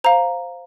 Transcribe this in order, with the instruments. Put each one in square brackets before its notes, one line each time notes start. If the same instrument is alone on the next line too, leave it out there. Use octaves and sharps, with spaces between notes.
[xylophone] C5 F5 A#5